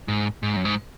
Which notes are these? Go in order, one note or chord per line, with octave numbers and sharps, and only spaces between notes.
G#2
G#2
F#2
G#2